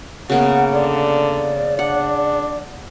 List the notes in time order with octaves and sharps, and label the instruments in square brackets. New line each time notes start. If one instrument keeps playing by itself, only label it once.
[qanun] C#3 A#3 B3 [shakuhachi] F#5
[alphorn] D3 [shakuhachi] D5
[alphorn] D4 [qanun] F#5